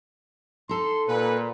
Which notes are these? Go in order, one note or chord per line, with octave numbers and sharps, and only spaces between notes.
D#4 A4 C6
A#2 B4